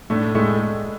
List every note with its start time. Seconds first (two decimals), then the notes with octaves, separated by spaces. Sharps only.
0.10 A2 A3 D4
0.35 A2 G#3 A3